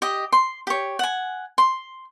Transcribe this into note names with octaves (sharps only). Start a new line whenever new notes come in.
G4 D#5
C6
G4 C#5
F#5 G#5
C6